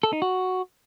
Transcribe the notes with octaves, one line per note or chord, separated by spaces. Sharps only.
A4
D#4
F#4